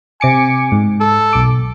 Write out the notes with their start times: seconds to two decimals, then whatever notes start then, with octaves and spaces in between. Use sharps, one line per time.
0.21 C3 G#5 D6 C#7
0.72 G#2
1.01 A4
1.33 B1 D6